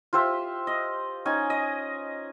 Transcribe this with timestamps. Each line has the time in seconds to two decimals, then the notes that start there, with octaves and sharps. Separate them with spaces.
0.13 F4 G4 C5 E5
0.67 D#5
1.25 C#4 D#4 D#5 G#5
1.50 D#5